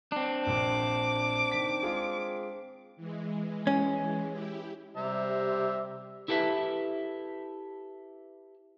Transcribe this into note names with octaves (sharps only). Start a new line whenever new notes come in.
C4 D4
A#1 A#2 D6
D#3 B6
G#3 F4 G#4
E3 G#3
C#4
E4 G4
C3 G3 C5 E5 A#5
E4 G4 A4 B4 E5